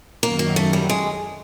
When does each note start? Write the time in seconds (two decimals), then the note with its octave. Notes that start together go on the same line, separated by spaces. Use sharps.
0.23 F#2 D#3 F#3 A#3
0.39 A#3
0.56 A3
0.73 G3
0.89 G#3